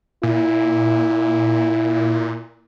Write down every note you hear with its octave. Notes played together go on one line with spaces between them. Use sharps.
A#2 E4